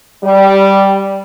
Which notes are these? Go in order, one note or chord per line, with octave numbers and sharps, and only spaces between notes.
G3